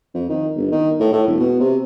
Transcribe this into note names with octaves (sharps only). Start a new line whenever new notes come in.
F2
D#3
G1
D#3
A2
A2
E1
B2
C3